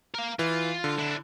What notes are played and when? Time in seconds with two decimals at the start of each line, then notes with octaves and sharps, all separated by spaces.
0.14 A#4 F5
0.39 E3 F4
0.84 D3
0.99 D4 E4